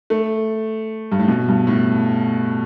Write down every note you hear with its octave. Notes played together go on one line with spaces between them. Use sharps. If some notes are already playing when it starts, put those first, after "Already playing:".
A3
G2
A2
B2
G2
A2